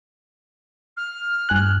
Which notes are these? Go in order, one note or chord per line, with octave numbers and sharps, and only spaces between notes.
F6
G2 G#5 F#6